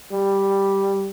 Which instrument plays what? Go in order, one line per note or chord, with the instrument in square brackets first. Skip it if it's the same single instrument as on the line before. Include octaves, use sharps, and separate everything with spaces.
[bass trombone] G3